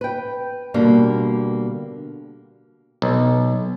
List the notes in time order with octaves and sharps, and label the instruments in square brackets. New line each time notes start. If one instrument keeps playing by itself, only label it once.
[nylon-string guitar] B4 G5
B2 D3 G3 A#3
[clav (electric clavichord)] B1